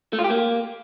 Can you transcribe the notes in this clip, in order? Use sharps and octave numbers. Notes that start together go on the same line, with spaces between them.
A3
F4
G4
A#3